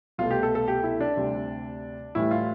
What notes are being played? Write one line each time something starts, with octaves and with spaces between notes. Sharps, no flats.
C2 B2 A3 F4
G4
A4
A4
G4
E4
D4
D2 C3 G3
A2 E3 G3 E4
F4